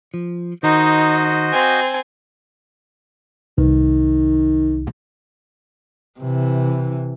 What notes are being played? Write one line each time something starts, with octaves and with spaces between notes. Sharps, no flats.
F3
D#3 D#4 F#4 C5 D#5
C4 G#5
C2 D#3
C3 E3